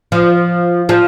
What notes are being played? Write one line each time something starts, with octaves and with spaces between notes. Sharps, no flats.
F3
F3